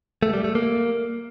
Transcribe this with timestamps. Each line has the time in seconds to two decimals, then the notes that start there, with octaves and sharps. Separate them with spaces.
0.23 A3
0.33 G3
0.44 A3
0.55 A#3